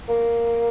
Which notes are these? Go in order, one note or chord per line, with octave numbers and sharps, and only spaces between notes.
A#3